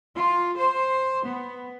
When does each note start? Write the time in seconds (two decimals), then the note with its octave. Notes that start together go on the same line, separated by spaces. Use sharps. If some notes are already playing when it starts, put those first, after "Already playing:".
0.17 F4
0.58 C5
1.27 B3